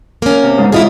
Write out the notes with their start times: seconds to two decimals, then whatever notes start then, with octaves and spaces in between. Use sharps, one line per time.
0.22 A#3 C#4
0.43 C3
0.58 G#2 C#3
0.72 G#2 E4 F4 G#4 D#5